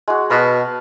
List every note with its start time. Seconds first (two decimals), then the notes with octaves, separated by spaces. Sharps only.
0.08 G#3 F#4
0.30 B2 B4 F5 A5